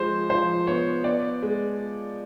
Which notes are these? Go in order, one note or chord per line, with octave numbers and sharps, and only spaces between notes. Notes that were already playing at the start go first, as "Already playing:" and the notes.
Already playing: F3 G#3 C5
F3 C5
B3 C#5
B3 D5
G#3